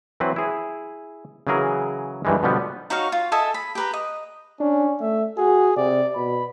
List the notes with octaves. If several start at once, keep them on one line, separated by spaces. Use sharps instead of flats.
E3 F#3 C4 B4
E4 G#4
C#3 E3 F#3 G#4 A#4
G2 D#3 E3 G3 G#3
B2 D3 F3 G3 B3
D#4 F#4 C#5 F5
F4
A4 D#5 E5 G#5
B5
G4 B4 A#5
D#5
C#4 D4
A3 E5
F#4 G#4
C3 D5
B2 B5